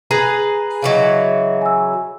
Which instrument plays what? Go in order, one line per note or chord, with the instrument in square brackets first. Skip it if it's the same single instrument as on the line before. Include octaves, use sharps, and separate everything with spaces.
[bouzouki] G#4 B4 A#5
[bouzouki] C#3 E3 F#3 [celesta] D#5 F5
[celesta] G#5 E6